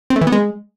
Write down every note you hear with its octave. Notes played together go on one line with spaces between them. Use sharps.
C4
A3
E3
B3
G#3